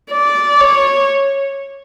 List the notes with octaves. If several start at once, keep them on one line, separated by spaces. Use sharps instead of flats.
D5
C#5